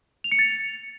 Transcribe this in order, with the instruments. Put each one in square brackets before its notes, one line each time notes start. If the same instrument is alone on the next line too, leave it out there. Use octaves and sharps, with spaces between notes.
[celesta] F7
C#7
A6